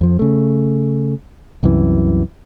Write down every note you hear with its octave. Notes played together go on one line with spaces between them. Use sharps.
F2 F3
C#3 A3
C2 F#2 C3 E3